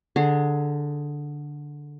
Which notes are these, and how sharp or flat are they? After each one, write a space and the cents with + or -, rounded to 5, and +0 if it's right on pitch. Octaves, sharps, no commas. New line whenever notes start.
D3 +0 G#4 +10 A#5 -45